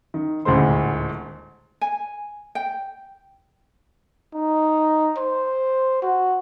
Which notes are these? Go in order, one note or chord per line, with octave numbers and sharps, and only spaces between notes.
D#3
D#1 D2 A2 G#3 C5 C6
G#5
G5
D#4
C5
F#4